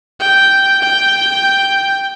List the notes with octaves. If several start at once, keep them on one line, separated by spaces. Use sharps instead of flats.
G5
G5